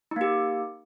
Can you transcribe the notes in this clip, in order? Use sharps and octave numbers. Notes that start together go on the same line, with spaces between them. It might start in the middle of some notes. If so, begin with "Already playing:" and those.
A#3 D#4 G4